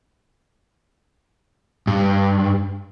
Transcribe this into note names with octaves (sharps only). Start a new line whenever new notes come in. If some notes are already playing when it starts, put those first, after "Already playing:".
G2